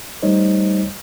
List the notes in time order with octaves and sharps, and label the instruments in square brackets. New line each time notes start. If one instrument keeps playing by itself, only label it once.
[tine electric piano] G3 A3 D#4 C5 C#5 D#5